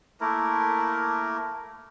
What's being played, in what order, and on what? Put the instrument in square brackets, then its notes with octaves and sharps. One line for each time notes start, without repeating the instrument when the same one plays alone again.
[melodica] A3 A#3 E4 A#4